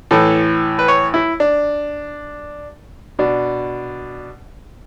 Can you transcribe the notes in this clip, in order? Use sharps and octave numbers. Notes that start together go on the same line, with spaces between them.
A2 E3 A4
B4
C#5
E4
D4
B2 D4